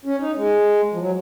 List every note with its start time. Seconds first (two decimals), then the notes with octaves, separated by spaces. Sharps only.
0.05 C#4
0.20 D#4
0.37 G#3
0.94 F3
1.00 F#3